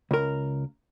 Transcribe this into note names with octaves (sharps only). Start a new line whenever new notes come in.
C#2 A#4